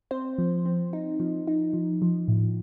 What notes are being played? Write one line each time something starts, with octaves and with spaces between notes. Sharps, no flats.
C4 C5
F3
C4
D#4
F3
D#4
F3
F3
A2